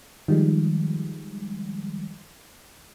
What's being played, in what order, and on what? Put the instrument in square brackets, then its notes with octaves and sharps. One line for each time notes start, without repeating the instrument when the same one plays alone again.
[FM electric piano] D#3 F3 G3 G#3